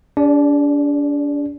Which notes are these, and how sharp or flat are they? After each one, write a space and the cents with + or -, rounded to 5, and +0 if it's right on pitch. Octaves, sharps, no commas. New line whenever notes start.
D4 -35 G#4 -45 D5 +0